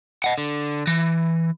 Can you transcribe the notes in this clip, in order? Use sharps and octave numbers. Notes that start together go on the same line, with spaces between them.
D#5 F#5
D3
E3